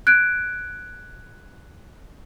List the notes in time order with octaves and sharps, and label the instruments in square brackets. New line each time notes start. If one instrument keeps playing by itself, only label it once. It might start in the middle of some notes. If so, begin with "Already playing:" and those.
[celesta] F#6 G#6 D7